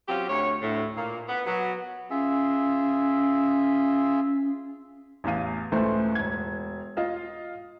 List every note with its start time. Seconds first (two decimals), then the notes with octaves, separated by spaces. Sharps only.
0.09 F#3 C4 C#4 F4 G4
0.30 D2 C#5
0.62 D2 A2
0.97 A#2 A#3
1.29 B3
1.46 F#3 B3
2.10 C#4 F4 G#4 E5
5.24 A1 E2 F5 D#7
5.72 C#2 A2 E3 A3 C5
6.15 E1 G#6
6.97 F4 D#5 F5